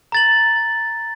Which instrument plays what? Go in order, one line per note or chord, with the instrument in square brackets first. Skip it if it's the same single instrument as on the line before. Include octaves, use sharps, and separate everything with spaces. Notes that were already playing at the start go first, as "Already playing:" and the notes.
[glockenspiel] A#5 A6 F#7